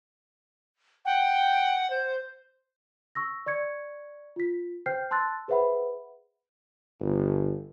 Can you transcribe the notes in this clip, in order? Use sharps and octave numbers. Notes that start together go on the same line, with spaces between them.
F#5 G5
C5
C#6 E6 A#6
D5 C#6 G#6 C#7
F4 B6
C5 G5 F6 G6 C7
A5 C6 E6 F#6 A6
G#4 B4 C5 E5 F#5 B5
G1